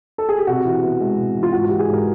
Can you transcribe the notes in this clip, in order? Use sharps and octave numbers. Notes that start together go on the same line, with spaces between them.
A4
G#4
G4
C3 F#4
E3
B3
G#3
C3
E3
F4
G#2 F#4
E3 G4
G#4
G#2
A#4